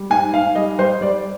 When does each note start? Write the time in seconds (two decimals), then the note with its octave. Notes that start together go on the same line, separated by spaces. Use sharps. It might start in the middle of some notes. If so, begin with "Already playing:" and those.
Already playing: G3
0.10 G#2 G#5
0.32 G#2 F5
0.55 G3 D#5
0.79 G3 C5
1.01 G3 D5